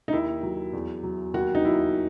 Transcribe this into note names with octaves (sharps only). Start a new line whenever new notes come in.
D#4
D#2 E4
F#3
E2
F#3
D#2 F#4
D#4
F#3 E4